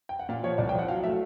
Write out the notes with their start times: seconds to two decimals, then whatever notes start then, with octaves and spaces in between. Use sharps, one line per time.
0.09 G5
0.19 F#5
0.29 A#2 F5
0.43 F3 C#5
0.58 C2 D5
0.69 G5
0.74 F3 F#5
0.88 F#3 F5
1.04 A3 E5